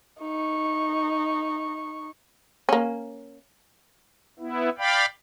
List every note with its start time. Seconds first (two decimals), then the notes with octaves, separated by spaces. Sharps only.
0.20 D#4 C#6
2.69 A#3 C#4
4.39 B3 E4
4.78 D5 F5 G5 B5